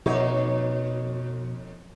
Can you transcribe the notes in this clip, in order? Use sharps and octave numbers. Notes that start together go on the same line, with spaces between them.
F2 B2 D#4 C#5